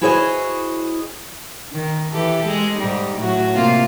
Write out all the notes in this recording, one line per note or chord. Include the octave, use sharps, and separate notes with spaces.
E4 F#4 G#4 C5 C#5 D#5
D#3
E3 G4 A4
G#3
G#2 G3 D#4
A2 F#3 F#4
C3 A#3 F4